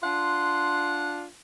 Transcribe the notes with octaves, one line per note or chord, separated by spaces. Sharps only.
D4 F4 F#5 C6